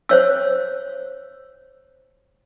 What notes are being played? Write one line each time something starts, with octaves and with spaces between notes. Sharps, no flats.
C5 C#5 E6